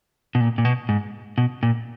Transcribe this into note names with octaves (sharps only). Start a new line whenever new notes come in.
B2
A#2
A#2
B2
G#2
B2
A#2